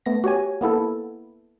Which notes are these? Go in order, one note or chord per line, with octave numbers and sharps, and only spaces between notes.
A3 B3 A#6
F#4 G4 C#5 G#5
A#3 B3 E4 A4